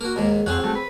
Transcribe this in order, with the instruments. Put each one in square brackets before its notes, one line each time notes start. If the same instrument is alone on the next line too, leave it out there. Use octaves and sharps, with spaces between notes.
[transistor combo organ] A#3 [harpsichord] F#4 A#4
[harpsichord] D#2 G#2 G#3
[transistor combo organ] F2 F#5 [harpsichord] C4 G#4 C#5
[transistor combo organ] F#3 A3
B4